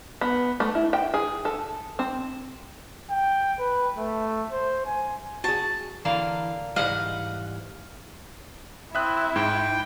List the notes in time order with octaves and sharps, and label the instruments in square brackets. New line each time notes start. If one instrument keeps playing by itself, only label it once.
[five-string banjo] B3
A3
E4
G5
G#4
A4
C4
[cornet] G5
B4
A3
C5
G#5
[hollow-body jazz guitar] F#4 G#4 [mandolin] A5
[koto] D3 A#3 F5 [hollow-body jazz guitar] E3
[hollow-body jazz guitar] G#2 E3 G3 [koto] D#5 F#5 [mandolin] F5
[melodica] C4 [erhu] E4 [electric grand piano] E5 D#6 F#6
[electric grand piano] G#2 [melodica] G5